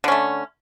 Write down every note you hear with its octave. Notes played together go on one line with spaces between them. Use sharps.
D3 A3 C#4